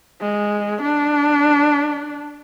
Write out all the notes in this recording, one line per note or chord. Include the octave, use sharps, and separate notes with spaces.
G#3
D4